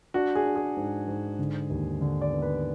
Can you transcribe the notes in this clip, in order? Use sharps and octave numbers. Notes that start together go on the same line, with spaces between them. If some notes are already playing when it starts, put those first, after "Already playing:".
D4 F#4
G#4
D4
G#4
G#2
G#2
D3
D#2
D3
D5
B3
B4